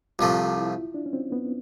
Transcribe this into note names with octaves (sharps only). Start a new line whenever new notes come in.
C2 C3 F3 A3 F4
E4
D4
C#4
C4
B3